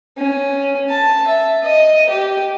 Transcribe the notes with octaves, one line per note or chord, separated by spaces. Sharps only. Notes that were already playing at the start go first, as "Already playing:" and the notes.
C#4
A5
E5
D#5
G4